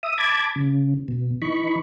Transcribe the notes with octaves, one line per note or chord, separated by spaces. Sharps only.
E5 D#6
A5 B5 D6 G#6
C#3
B2
E3 D#4 B5 C#6